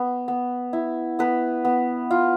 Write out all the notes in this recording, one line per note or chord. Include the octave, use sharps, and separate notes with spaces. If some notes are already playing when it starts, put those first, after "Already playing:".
Already playing: B3
B3
E4
B3 B4
B3
F4